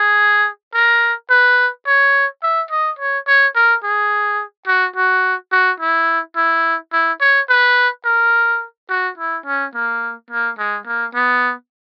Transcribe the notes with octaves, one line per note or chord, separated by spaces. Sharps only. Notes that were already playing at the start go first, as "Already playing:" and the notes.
Already playing: G#4
A#4
B4
C#5
E5
D#5
C#5
C#5
A#4
G#4
F#4
F#4
F#4
E4
E4
E4
C#5
B4
A#4
F#4
E4
C#4
A#3
A#3
G#3
A#3
B3